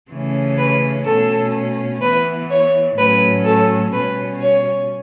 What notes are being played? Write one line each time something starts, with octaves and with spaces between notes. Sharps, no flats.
C#3 E3 A3 C#4
B4
B2 A3 C#4 A4
E3 B3 B4
C#5
A2 F#3 A3 C#4 B4
A4
B2 G3 C#4 B4
C#5